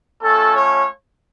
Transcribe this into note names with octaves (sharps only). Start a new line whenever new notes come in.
A3 C#4 F4 A4
C#5